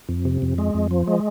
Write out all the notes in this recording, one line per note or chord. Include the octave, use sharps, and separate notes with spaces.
F2
C3
F2
G#3
F2
F3
G#3